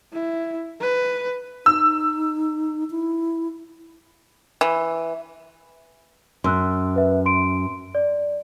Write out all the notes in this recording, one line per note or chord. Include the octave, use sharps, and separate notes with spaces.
E4
B4
D#4 E6
E4
E3
F#2 C6 E6 F#6
B4 E5
C6 D7
D5